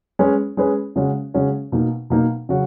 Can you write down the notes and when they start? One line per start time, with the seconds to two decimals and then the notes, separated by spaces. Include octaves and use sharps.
0.19 G#3 C#4 G#4 B4
0.57 G#3 C#4 G#4 B4
0.96 C#3 G#3 C#4 F#4
1.34 C#3 G#3 C#4 F#4
1.72 B2 A#3 D#4
2.10 B2 A#3 D#4
2.49 C#3 F#3 C#4 F#4